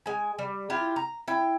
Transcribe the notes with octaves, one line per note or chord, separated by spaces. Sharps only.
G#3 G#5
G3
E4 F4 G4
A#5
E4 G5